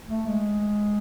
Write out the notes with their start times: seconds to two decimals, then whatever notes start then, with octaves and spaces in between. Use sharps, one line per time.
0.09 A3
0.27 G#3